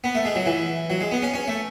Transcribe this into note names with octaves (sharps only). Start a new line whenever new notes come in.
B3
A3
G#3
F#3
E3
F#3
G#3
B3
C#4
C#4
A3